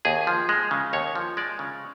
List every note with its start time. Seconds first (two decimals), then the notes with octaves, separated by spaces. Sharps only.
0.05 D#2 G#4
0.27 F3
0.49 G#3
0.71 C#3
0.93 D#2 C#5
1.15 F3
1.37 G#3 D5
1.59 C#3